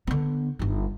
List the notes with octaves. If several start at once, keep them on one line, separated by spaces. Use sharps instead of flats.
D3 B3
G1 D#3